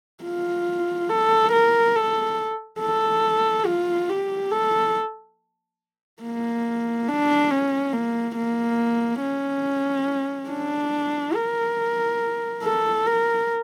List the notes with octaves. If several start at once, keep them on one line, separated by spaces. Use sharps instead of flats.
F4
A4
A#4
A4
A4
F4
G4
A4
A#3
D4
C#4
A#3
A#3
C#4
D4
A#4
A4
A#4